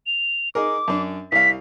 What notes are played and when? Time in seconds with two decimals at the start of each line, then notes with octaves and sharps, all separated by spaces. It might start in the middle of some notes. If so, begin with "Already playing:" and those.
0.07 F7
0.55 D#4 G#4 A#4 D6
0.88 F#2 D4
1.32 C2 F5 B6